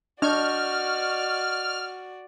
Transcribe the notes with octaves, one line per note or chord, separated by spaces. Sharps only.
D4 F#4 D5 D#5 C#6 F6 G6